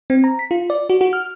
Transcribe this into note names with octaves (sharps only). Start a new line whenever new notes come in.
C4
A#5
B6
F4
D5
F#4
F#4
F6